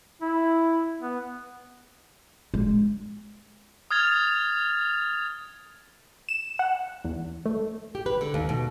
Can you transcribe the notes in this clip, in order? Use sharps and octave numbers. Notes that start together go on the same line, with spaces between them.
E4
B3
G#3
D#6 F6 G#6 A6 F7
E7
F#5
E2
A3
G4
B4
D3
D#2
B2